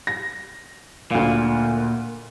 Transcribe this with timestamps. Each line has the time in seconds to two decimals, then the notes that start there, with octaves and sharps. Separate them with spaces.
0.07 A#6
1.11 D2 A#2 F5